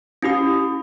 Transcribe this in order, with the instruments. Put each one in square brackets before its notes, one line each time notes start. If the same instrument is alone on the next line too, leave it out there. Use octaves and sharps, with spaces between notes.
[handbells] C#4 E4 G4 D#6